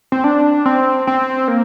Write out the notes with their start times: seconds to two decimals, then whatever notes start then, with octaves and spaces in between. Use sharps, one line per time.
0.12 C4
0.24 D4
0.66 C4
1.07 C4
1.48 A#3